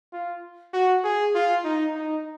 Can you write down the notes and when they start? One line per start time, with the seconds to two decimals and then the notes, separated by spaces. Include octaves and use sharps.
0.13 F4
0.73 F#4
1.04 G#4
1.35 F4
1.64 D#4
1.95 D#4